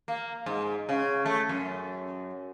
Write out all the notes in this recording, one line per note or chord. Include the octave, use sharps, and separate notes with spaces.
A#3
G#2
C#3
A3
F#2